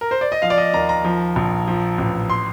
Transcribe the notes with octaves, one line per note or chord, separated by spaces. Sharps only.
A#4
C5
D5
D#5
F3 F5
D5
D#5
D#2 A#5
A#5
F3
A#1
F3
A1
C6